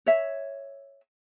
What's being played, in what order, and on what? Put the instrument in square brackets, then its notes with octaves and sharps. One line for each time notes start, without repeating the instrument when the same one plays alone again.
[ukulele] C#5 E5